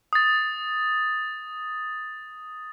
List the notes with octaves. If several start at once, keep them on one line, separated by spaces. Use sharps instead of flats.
D#6 A6